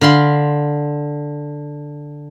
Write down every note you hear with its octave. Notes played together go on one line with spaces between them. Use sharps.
D3 F5 B5 C6